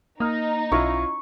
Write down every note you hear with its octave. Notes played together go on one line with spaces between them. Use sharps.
A#3 D#4 D#6 F6
B1 C#4 E4 F4 C#6